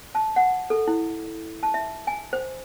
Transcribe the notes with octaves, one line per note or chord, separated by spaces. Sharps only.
A5
F#5
A4
E4
A5
E5
G#5
C5